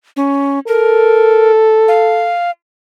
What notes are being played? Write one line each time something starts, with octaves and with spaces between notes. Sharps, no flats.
C#4
A4 A#4
F5